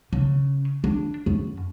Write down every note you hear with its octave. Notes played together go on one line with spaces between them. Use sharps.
C#3
D4
F#2